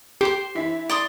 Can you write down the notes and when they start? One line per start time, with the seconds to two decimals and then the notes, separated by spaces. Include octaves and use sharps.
0.21 G4 C5 C6
0.55 E3 E4 B6
0.89 D5 C6 D#6